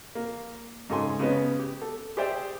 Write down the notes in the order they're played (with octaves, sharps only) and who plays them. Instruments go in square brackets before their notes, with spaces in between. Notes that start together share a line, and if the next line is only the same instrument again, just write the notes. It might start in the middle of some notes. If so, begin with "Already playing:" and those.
[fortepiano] A#3
G#2 C#3 A4 G#5 C6
C#3 G#3 B3 C#4
G4
A4
G4 G#4 C5 D5 E5 G5